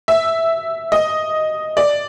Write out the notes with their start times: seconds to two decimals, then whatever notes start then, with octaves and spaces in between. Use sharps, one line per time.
0.08 E5
0.92 D#5
1.77 D5